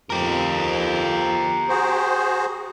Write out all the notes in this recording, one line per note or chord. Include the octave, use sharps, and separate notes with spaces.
F2 G4 A#4
F#4 G#4 C5